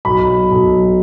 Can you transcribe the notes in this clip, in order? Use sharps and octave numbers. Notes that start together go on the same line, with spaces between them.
B1 B5
B1